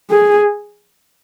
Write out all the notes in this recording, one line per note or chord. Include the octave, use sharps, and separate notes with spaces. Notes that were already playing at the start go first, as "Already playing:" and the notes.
G#4